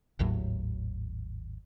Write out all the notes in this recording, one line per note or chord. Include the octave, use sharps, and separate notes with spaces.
G#1 D#2 A2 F#3